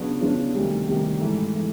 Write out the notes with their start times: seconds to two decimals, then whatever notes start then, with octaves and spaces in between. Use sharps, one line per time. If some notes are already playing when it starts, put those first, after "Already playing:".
Already playing: C#3 F#3 B3 D4 F4
0.21 C#3 F#3 B3 D4 F4
0.55 D2 C3 D#3 G3
0.87 D2 C3 D#3 G3
1.20 G#2 E3 A3
1.53 E3 A3